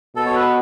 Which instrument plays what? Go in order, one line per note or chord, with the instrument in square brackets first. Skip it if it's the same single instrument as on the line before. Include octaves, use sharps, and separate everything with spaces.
[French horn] B2 [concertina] A4
[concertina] C#5
B4